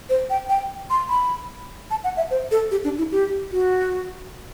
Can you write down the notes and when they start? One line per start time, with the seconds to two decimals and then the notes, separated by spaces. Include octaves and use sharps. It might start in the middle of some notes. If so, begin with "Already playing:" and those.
0.09 C5
0.30 G5
0.49 G5
0.90 C6
1.10 B5
1.91 A5
2.04 F#5
2.17 E5
2.31 C5
2.51 A4
2.71 G4
2.84 D4
2.98 E4
3.12 G4
3.52 F#4